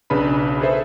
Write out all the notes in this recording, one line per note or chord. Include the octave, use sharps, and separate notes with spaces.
B1 C#3 D4 B4 B5
G#4 A4 B4 C5 E5